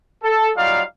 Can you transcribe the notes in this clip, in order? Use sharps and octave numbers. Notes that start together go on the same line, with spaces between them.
A4
F#3 G3 D#4 F4 D5 F5